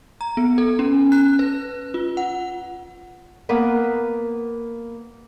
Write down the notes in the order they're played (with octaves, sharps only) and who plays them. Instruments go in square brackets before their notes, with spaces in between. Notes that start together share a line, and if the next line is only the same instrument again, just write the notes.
[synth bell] A#5
B3
A4
C#4
F#6
B4
F4
F#5
[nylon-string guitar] A#3 B3 A#4 B4